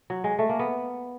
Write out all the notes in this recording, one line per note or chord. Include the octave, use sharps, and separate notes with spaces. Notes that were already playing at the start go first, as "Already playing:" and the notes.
F#3
G#3
A3
A#3
B3